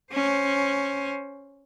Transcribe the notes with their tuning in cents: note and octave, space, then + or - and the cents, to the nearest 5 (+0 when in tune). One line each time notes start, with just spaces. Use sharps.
C#4 +0 C5 +10